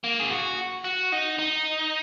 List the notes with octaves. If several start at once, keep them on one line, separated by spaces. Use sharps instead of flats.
A#3
G#4
F#4
F#4
D#4
D#4